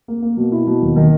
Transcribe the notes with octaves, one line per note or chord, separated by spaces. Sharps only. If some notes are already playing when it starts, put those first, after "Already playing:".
A#3
A#3
B2
E4
B2
D#2
D#3